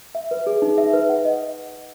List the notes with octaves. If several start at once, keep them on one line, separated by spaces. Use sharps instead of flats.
E5
B4
G#4
D#4
E5
B4
F#5
D#5